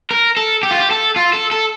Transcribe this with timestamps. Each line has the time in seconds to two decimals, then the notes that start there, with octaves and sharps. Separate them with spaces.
0.11 A#4
0.37 A4
0.63 G4
0.71 F4
0.79 G4
0.91 A4
1.16 F4
1.33 A4
1.52 A4